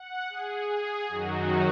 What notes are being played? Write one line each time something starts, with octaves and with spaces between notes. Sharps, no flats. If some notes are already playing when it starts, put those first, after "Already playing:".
Already playing: F#5
G#4
G#4
F#2 D#3 F#3 D#4 F#4